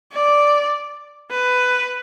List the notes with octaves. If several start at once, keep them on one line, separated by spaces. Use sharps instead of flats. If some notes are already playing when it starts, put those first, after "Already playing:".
D5
B4